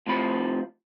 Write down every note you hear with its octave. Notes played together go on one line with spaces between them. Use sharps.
A2 C3 F3 B5